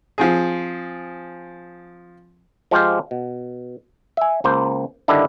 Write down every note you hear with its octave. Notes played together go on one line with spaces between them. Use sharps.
F3 C4 G#4
F3 G#3 F4 G4 C5 F5
B2
E5 G#5
C#2 A#3 C5
G2 D3 D#3 D4 E4